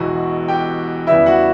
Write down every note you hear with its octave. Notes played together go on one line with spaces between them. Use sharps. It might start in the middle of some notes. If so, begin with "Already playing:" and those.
Already playing: E1 E2 B2 F#4
G4 G5
E2 C#3 G3 B3 E4 E5
F#4 F#5